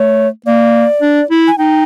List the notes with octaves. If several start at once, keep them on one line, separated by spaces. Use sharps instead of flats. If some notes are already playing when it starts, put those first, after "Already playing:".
Already playing: A3 C#5
A#3 D5
D4
E4
G#5
D#4 G5